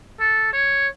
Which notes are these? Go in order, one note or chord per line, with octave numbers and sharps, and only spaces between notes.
A4
C#5